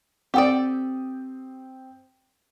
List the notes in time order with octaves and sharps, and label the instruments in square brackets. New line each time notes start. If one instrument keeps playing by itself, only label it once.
[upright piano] C4 G5 D#6 [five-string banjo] G4 A4 D5